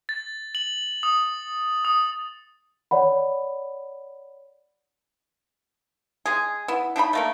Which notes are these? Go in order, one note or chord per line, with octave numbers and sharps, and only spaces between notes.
A6
F#7
D#6
D#6
C#5 D5 F#5 B5
G#3 G#4
B3 E4
D4 D#4 G4 B5
A3 A#3 A#4